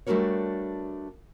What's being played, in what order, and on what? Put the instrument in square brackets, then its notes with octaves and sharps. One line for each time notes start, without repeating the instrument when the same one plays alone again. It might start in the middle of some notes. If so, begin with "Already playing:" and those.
[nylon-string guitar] G3 A3 D4 F#4 A#4 C#5